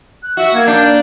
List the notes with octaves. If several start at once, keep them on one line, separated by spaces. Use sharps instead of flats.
F#6
F#4 E5
A#3 G#6
D4 G6